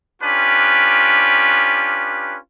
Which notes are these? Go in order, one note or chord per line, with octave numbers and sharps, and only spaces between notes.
C#4 D4 F4 G4 B4